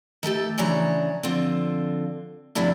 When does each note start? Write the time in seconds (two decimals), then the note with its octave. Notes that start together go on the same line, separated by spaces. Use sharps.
0.23 D#3 A3 G4 A4
0.58 C#3 E3 D4 C#5 A#5
1.23 D3 F3 C4 F4
2.55 D2 G2 C3 F3 D4 E4